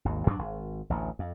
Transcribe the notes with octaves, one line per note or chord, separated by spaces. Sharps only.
G#1 D#2
G2 F#3 A#3 D4
G#1
A1 D2
F2